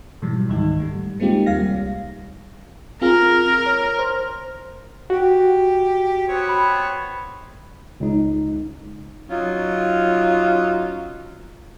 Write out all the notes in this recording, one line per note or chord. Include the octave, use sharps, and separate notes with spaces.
G#2 B2 E3 F#3 G3
C#2 G#2 D#3 D#4
G3 A3
G#3 A#3 C4 D#4 F4 G4
D#2 G3 F5 A#6
C2
C4 F4 G#4 A#4
C#5
C5
F#4 G4
B3 C4 C#5
B5
C#2 D#4
F#3 C#4 D#4 F4